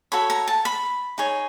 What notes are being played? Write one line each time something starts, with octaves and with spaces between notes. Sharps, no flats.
F#4 A4 C#5 B5
A#5
A5
B5
D#4 G#4 C#5